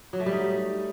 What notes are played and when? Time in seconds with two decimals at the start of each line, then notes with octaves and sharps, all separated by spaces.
0.13 F#3
0.20 A3
0.26 G3
0.33 D#4